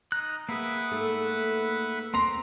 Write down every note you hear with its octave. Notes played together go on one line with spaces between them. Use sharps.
D#4 A#5 F#6
A#3 G#4 B4 E5 F#5
G#2 A3 A4
A#3 C4 A#5 C6